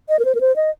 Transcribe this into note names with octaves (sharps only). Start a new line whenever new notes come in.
D#5
A#4
C5
A#4
C5
D#5